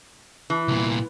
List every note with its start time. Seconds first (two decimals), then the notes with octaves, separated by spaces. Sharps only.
0.50 E3 E4
0.68 C2 A#2